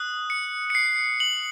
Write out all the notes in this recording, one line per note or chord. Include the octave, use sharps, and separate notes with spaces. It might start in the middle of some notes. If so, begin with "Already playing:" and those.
Already playing: D#6 F#6
C#7
C#7
C7
F#7